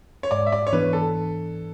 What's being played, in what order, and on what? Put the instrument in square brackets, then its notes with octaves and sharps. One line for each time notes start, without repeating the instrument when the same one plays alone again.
[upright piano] C#5
[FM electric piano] G#2 [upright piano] D5
[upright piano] E5
D5
C#5
[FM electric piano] E3 B3 D4 [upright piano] B4
[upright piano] A4